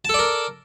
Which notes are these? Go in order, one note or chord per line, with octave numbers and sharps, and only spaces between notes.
A4 A#4 D5 A5